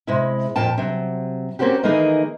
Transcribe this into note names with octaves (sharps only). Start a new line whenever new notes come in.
C3 G#3 E4
F2 A#2 G5 A5
C3 F#3
A#3 C4 C#4 F#4 G4
D#3 E3 A3 A#3 D#4 G#4